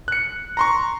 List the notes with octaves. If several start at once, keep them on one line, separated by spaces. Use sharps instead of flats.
F#6 C#7
A#5 C6 C#6